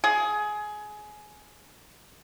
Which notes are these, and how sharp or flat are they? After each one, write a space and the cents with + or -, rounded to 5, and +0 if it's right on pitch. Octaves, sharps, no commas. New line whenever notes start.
G#4 +20